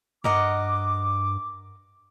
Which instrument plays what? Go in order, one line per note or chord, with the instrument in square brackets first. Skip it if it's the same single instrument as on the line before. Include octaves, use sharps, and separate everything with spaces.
[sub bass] G2 [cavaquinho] A#4 D#5 F#5 [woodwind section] D6